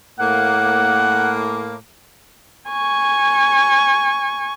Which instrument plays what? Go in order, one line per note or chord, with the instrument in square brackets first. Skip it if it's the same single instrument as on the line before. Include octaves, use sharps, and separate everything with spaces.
[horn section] A2 A#3 [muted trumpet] F#5
[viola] G#5 C#6